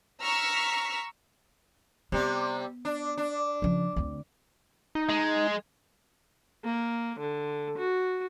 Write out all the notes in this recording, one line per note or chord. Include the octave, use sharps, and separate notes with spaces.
A#5 C#6 E6 F6 B6
C3 G3 B3
D4
D4
C#3 F3
D2 C4
D#4
G#3
A#3
D3
F#4